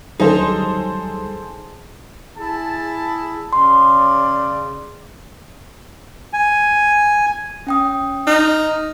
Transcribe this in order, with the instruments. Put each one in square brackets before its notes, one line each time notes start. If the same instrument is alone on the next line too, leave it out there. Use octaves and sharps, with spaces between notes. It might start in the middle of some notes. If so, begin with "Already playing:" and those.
[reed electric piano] D2 [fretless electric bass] F#3 G3 C#4 [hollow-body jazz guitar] D#4 [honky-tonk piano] G#4 A4 C5
[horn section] E4 G#4 A5
[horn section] C#3 D5 [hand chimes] C6
[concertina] G#5
[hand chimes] C#4 G5 D#6
[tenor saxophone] D#4 [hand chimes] F6